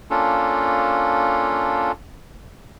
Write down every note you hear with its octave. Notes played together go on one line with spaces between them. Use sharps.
A#3 C#4 D4 F4 A4